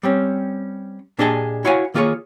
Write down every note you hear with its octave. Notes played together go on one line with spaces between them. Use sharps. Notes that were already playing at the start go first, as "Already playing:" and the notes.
G3 C4 C#4
A#2 D4 G4 G#4 D#5 A5
E4 F#4 C#5 F5 F#5 G#5
D#3 A#3 F4 G#4 C#5